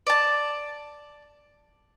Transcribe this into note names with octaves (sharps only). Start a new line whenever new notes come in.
D5 A5